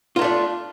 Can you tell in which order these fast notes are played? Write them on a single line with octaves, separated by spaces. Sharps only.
F4 A#3 A3 D4